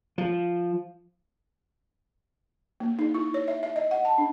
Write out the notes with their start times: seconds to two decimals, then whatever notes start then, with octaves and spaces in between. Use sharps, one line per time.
0.18 F3
2.80 A#3
2.99 D#4
3.15 E4
3.34 C#5
3.48 E5
3.63 E5
3.76 D#5
3.91 F#5
4.05 A5
4.18 D4